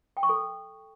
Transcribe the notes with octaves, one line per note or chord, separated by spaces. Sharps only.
G5
C#6
A4